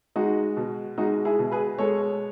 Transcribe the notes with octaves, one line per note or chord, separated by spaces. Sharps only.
G#3 D#4 F#4
B2
G#3 D#4 F#4
E4 G#4
B2
G#4 B4
G#3 A4 C#5